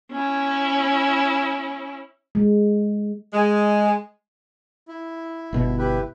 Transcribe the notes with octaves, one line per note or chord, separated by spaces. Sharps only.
C#4 E4
G#3
G#3
E4
G1 B2
E4 G4 B4